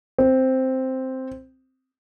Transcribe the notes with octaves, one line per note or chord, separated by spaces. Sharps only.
C4